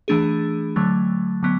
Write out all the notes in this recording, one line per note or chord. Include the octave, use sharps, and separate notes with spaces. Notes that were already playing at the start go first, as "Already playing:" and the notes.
E3 A3 D4 G#4
D3 F#3 A3
D3 F#3 B3